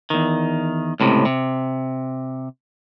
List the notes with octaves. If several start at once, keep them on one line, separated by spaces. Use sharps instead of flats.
E2 D#3
C#2 A2 C3
C3